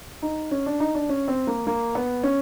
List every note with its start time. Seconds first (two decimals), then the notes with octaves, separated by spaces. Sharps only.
0.22 D#4
0.51 C#4
0.66 D4
0.80 D#4
0.95 D4
1.09 C#4
1.28 C4
1.47 A#3
1.67 A#3
1.95 B3
2.23 C#4